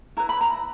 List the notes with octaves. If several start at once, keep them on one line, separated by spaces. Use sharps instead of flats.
E4 B4 A#5
B5
A#5